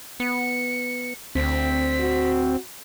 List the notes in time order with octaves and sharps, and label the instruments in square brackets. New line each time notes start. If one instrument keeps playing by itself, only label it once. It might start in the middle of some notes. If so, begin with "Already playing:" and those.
[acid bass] B3 [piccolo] C#7
[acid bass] D2 [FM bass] C4 [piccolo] B6
[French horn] F#4